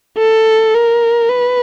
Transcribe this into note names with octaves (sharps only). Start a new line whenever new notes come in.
A4
A#4
B4